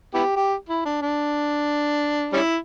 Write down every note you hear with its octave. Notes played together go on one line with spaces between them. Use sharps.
B3 E4 G4
G4
E4
D4
D4
G3 C#4 E4